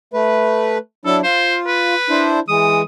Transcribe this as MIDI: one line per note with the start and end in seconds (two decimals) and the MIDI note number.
0.14 0.78 57
0.14 0.78 71
1.05 1.21 54
1.05 1.21 62
1.05 1.21 64
1.05 1.17 69
1.23 1.94 65
1.23 1.57 72
1.66 2.30 71
2.10 2.40 62
2.10 2.40 64
2.10 2.40 72
2.48 2.82 52
2.48 2.82 56
2.48 2.81 87